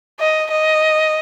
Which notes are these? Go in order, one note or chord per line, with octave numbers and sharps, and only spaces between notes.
D#5
D#5